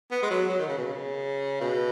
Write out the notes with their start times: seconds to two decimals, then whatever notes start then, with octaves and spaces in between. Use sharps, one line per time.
0.11 B3
0.22 G#3
0.30 F#3
0.49 F#3
0.59 D#3
0.69 C#3
0.77 B2
0.87 C#3
1.61 B2